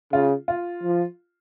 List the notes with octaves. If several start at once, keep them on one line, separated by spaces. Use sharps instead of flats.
C#3 F4
F4
F3